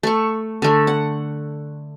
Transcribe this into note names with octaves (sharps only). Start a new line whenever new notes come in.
A3 C#6
D3 A3
F#5